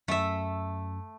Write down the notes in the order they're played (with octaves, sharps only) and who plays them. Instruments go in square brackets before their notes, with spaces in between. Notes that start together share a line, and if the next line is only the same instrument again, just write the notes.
[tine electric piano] F#2 [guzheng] A3 E5